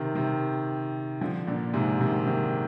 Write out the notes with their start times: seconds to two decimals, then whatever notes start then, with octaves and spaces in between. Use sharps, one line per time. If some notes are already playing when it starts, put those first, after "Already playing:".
Already playing: C3 D#3
0.15 C3 D#3
1.21 D3 F3
1.47 A#2 D3
1.73 G#2 C3
2.01 C3 D#3
2.26 C3 D#3